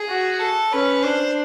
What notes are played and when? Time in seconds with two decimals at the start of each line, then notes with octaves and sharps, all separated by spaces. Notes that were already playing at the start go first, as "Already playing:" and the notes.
Already playing: G#4
0.09 F#4
0.40 A4
0.72 C#4 B4
1.03 D4 C5